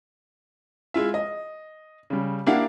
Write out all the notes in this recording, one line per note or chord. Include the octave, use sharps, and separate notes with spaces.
G#3 E4 F4 E5
D#5
C#3 G3
A#3 D4 E4 G4 F5 F#5